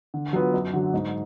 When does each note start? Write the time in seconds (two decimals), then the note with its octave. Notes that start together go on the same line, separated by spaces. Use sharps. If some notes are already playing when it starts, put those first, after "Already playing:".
0.14 D3
0.33 F#3 B3 F4
0.54 F#2
0.73 D3 F#3
0.94 G#2